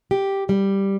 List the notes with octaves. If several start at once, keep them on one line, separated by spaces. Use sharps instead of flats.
G4
G3